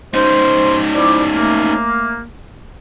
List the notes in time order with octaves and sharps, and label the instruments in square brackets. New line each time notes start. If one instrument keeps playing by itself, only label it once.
[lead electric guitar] C#4 D#4 [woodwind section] C5
[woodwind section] E4 C5 D5
A3 A#3